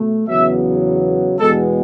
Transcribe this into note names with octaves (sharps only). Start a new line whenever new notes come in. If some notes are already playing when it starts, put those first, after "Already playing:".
Already playing: B2 A3
E2 C#3 F#3 B3 E5
E2 B2 G#3 B3 A4